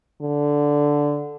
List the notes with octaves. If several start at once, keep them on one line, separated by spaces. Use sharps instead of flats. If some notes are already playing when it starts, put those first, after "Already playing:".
D3